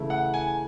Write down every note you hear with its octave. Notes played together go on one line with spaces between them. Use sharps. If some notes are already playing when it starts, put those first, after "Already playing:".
Already playing: C#3 E3 A3 E4
F#5
G#5